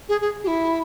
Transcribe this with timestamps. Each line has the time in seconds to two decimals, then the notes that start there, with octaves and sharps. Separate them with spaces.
0.08 G#4
0.20 G#4
0.43 G4
0.47 E4